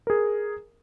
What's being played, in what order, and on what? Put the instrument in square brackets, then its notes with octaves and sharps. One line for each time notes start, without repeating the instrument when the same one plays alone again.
[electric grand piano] G#4 A#4